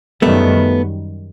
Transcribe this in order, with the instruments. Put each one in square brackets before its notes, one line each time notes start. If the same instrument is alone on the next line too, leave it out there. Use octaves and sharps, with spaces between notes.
[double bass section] F#2 D#3 G3 [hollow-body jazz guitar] A3 B3